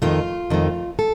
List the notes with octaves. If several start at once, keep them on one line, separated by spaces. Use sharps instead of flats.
F2 D#3 A3 F4
F2 D#3 A3
A4